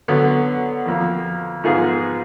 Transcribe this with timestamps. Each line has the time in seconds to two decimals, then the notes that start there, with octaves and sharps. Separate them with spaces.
0.08 D3 F#3 B3
0.86 F2 F3 A#3
1.64 G#2 F3 B3 F4 G#4